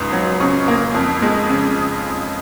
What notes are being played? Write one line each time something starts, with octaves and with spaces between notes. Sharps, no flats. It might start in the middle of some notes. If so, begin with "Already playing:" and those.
Already playing: C#2 G#2 D#6
F#3
C#3 C#6
A#3
F2
G#3
C#3